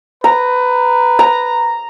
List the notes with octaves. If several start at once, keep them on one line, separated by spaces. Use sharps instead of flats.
B4 A#5
A#5